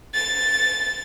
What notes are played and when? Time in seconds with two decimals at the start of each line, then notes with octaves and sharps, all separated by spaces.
0.15 A6